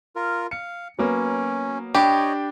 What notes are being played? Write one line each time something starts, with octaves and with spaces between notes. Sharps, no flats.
F4 A#4
F5 C#7
F#3 A#3 B3 C#4
D4 G4 C#5 D#5 G5 B5